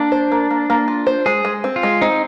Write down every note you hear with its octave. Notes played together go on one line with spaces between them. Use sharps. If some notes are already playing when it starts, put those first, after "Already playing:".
Already playing: A#3 D4
C5
A#3
A#3
A#3
F4
C5
G#3 G#4
G#3
C4
F4
G#3
C4 D#4